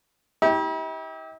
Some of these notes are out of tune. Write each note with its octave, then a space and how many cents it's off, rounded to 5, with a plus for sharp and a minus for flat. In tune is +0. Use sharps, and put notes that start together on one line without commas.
E4 -45 G4 +0